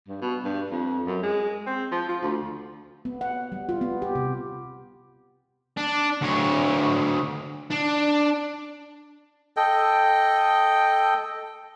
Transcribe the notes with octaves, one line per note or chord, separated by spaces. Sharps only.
G2
B2
G2
F2
F#2
G#3
C4
F3
F4
D2
B3
F#5
G3
F4
B3
G4
C3
D4
D2 C#5
D4
A4 D#5 G5